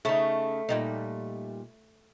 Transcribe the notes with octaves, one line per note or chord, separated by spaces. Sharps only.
C#3 A3 D#4
A#2 G3 D#4